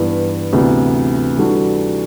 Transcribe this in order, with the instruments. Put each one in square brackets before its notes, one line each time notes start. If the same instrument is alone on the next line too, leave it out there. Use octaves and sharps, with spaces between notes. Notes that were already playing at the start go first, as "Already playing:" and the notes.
Already playing: [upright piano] G2 E3 B3
D2 C3 E3 B3
E3 G3 D4 F#4 A4